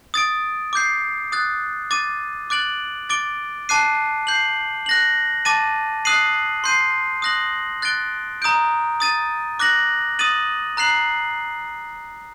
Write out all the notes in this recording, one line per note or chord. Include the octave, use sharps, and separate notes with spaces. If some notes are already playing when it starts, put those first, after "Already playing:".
D#6 A6 D7
D6 G6 C7
D#6 F#6 A6
D6 A6 D#7
D6 F#6 A6 D7 F#7
D6 A6 D7 G7
A5 D6 F#6 C7 D#7
G6 C7 F#7
F#6 A#6 F#7
A5 D6 A6 D#7
D#6 F#6 C7 D#7 F#7
C6 G6 C7 D#7
D#6 F#6 A#6 F#7
F#6 A6 D7 G7
A#5 D#6 G6 D7
D#6 A6 D#7
D6 F#6 A#6 F#7
D#6 A6 D#7 F#7
A#5 F#6 C7 F#7